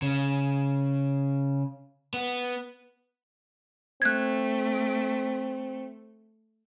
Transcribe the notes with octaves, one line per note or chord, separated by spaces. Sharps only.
C#3
B3
A3 C4 F#6 G#6